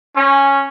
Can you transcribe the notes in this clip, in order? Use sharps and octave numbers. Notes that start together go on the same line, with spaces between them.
C#4